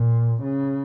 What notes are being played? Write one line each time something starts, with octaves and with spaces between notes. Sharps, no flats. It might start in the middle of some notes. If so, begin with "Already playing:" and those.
Already playing: A#2
C#3